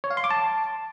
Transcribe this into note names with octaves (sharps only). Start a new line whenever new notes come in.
C#5
F5
C6
D6
A5